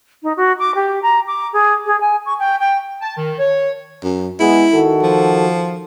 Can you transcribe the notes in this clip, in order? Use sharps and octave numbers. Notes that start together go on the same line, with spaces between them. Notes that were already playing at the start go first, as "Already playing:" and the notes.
D#4
F#4
D6
G4
A#5
D6
G#4
G#4
G#5
C#6
G5
G5
A5
D#3
C#5
F#2
G#3 B3 E4 G#4
D#3 F#4 A4
F3